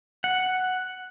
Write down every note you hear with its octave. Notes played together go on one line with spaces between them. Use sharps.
F#5